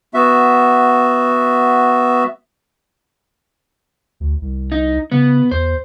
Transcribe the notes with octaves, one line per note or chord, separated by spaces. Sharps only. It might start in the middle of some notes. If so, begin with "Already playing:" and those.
B3 F#4 E5
D2
C2
D#4
C#3 B3
E2 C5